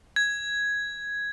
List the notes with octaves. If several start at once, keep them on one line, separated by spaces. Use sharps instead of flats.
G#6